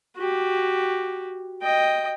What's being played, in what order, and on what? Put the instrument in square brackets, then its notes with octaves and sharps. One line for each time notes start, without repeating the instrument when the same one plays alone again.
[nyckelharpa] F#4 G4
D#5 G5